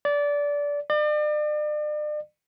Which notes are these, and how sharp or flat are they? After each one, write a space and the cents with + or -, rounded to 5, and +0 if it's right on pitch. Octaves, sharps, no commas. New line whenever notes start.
D5 -20
D5 +40